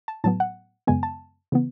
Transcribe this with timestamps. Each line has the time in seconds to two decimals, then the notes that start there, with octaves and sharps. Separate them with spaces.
0.08 A5
0.24 A2 F#3 B3 A5
0.40 F#5
0.87 F#2 C#3 G#3 B3 G#5
1.03 A5
1.52 C#3 E3 B3